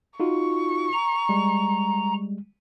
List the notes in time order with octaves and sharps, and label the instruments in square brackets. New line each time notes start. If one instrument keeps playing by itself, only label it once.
[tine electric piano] D#4 F4 F#4 [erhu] C#6
[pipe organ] A#5
[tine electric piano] G3 G#3